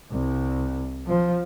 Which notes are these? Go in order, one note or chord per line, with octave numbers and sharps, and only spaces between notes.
C2
F3